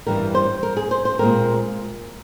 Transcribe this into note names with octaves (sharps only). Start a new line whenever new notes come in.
G2 E3 G3 A#4
C5
A#4
G#4
C5
C5
A#2 G#3 C4 A#4